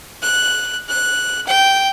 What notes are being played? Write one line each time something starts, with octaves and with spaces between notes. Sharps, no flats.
F#6
F#6
G5